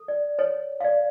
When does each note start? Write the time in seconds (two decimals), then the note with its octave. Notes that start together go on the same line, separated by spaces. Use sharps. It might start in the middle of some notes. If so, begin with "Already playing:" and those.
Already playing: A4
0.08 D5
0.39 C#5
0.80 F5
0.84 C#5 D5